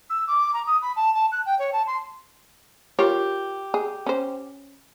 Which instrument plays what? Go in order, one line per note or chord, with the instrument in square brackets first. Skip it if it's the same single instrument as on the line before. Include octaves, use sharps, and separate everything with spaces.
[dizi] E6
D6
A#5
D#6
B5
A5
A5
F#6
G5
C#5
A5
C6
[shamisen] F4 A#4 C#5 [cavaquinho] G4
[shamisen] G#4
C#4 C5